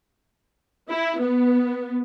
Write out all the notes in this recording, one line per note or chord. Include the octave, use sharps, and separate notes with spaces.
E4
B3